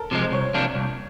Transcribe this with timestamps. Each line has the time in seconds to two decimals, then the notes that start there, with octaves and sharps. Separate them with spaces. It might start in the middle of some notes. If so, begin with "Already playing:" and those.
Already playing: A4 A#4
0.11 C3 F3 G#3
0.22 C5
0.32 C2 C#5
0.54 C3 F3 A#3 D4
0.75 C2